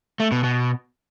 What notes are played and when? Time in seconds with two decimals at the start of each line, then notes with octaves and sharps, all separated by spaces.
0.20 A3
0.32 B2
0.44 B2